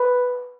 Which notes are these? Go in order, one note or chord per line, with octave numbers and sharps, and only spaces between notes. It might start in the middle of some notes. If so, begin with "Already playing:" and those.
Already playing: B4